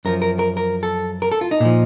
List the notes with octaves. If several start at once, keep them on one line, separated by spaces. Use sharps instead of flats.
F#2 F3 A#4
A#4
A#4
A#4
A4
A#4
A4
F4
D#4
A#2 F3